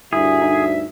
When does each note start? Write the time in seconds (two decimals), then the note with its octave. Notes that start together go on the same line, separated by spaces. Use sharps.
0.13 D2 G2 E4 G#4 E5
0.42 D#4